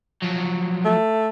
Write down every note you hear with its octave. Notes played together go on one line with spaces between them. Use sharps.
F3 F#3
A3